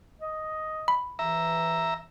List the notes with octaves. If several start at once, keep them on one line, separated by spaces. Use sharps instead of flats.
D#5
B5
E3 E5 A#5